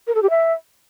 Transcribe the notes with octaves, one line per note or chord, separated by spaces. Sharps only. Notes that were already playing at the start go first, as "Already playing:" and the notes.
A#4
A4
G4
E5